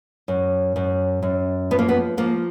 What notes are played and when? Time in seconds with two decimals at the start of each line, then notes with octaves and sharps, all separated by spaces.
0.28 F#2
0.76 F#2
1.22 F#2
1.71 F3 B3
1.79 A#3
1.89 B3
2.17 F3 A#3